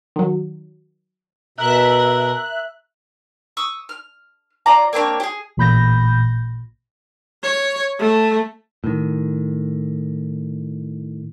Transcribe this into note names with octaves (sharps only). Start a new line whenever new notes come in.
D#3 F#3
B2 A#4 E5 F#6
C#6 D#6 E6
F6
C#4 F4 D5 A#5
A#3 C4 D4 C#5
G4 G#4
A1 A#2 B5 G6 A#6
C#5
A3
A2 D#3